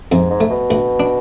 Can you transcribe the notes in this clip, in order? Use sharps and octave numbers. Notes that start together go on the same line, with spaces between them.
F2 G#2
G#2
A3
B2
D2
D4